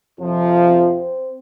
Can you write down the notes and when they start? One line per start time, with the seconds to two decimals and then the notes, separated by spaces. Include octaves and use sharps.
0.18 F2 C3 F3
0.67 C4